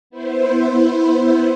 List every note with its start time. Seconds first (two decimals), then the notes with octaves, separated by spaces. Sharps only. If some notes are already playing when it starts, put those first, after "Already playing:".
0.10 B3 E4 C5